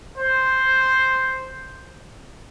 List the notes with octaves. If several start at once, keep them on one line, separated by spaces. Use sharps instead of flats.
C5